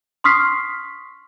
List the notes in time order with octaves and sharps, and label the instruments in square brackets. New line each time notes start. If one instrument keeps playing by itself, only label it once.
[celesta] C6 C#6 D#6 F6 B6 C7